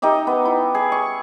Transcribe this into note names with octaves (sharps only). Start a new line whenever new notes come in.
D#4 G4 D#5 E5
B3
E4
G#4
C#6